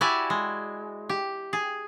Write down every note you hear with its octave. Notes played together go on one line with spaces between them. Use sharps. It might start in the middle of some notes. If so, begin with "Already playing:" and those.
E4 F#4 G4 D5 E5 G#5
G#3
G4
G#4